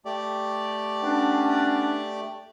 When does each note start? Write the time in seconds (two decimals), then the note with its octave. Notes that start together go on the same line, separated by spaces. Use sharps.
0.05 A3 G4 D5
1.02 B3 C#4 D4